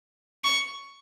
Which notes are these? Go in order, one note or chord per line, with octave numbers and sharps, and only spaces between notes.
C#6